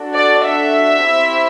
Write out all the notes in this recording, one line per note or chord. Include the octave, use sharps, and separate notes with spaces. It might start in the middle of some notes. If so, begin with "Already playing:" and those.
Already playing: D4 F#4 A4
D5
E5
C4 E4 G4